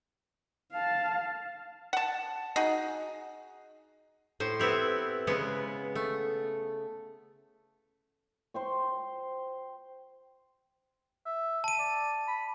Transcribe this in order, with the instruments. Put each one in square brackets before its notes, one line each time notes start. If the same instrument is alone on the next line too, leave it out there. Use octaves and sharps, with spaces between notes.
[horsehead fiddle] F5 A5
[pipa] F#5 A5
D#4 F#4 G#4
[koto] A2 C5
B3 C4 E4 G4
C#3 G#3 B3
A3
[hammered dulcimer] C5 G5 C#6
[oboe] E5
[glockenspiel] A5 D#7
[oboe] D5
B5